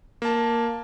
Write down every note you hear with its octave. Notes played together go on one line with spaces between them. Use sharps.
A#3 A5